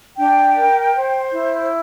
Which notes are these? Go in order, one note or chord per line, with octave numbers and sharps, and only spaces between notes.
D4 G5
A#4
C5
E4